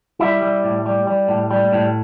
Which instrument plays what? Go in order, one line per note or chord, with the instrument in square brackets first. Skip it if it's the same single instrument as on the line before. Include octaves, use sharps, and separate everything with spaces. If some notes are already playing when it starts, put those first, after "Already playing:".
[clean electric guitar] G3 E4 E5
G3
A2
G3
G3
A2
G3
A2